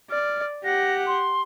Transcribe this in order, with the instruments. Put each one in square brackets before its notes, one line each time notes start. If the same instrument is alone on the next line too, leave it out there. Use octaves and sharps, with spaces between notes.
[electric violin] D5 [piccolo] F6
[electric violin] G4 F#5 [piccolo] A#6
[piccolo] C6